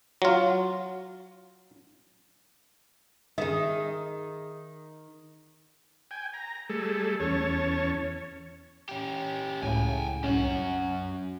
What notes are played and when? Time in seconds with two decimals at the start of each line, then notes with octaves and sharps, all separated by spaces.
0.22 F#3 F4
3.38 D#3 D#4 G#4 E5
6.11 G5 G#5
6.33 A#5
6.69 G3 A3 G#4 A4
7.20 E2 C#4 C#5 A5
8.89 C#4 G4
9.63 C#2 A2 C#3 G5 G#5
10.24 C2 F#2 C#4 F#4
10.45 C#4